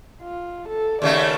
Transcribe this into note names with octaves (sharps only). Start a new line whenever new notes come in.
F4
A4
D#2 C#3 A3 D5